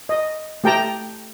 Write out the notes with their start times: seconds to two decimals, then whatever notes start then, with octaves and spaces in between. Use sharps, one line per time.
0.09 D#5
0.64 A3 G4 G5 A5 A#5